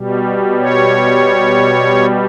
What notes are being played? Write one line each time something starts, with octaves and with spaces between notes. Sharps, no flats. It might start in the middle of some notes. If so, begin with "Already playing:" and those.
Already playing: B2 G3
C#5